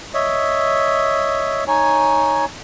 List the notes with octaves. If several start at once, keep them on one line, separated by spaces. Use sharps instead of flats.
C#5 D#5 E5
D#4 C#5 G#5